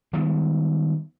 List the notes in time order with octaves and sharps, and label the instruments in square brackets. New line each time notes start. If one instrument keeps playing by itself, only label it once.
[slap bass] D#3 G3 G#3 B3